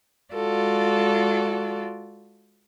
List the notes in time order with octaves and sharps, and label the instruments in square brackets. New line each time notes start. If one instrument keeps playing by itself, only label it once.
[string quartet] G#3 F4 F#4 A4 D5